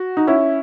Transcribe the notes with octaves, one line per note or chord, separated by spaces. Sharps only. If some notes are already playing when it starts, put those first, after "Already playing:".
Already playing: F#4
D#4
C#4 E4